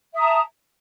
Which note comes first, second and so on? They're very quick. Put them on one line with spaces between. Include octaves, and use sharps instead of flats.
E5 D#6 A#5 A5